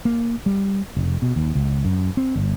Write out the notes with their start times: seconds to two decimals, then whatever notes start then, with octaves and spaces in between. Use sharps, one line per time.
0.05 A#3
0.46 G3
0.96 F1
1.22 B2
1.36 D#2
1.55 C#2
1.85 F#2
2.17 C4
2.36 G1